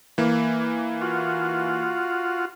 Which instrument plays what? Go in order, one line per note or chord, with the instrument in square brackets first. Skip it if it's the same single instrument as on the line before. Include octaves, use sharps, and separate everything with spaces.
[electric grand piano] E3 A#3
[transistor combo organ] F4 F#4